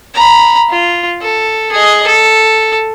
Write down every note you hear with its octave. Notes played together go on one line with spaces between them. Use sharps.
A#5 B5
F4
A4
G#4 D#5
A4